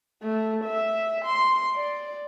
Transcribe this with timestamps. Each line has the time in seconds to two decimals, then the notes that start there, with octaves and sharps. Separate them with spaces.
0.23 A3
0.64 E5
1.25 C6
1.75 D5